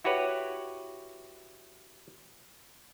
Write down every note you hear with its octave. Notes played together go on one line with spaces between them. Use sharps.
E4 F#4 G4 B4 C#5